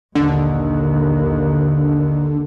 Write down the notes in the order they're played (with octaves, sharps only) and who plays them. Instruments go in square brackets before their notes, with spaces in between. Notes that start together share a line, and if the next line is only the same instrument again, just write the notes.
[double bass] A#1 D#2 [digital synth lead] D3